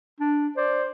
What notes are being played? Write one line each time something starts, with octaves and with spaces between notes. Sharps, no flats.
D4
C5 D5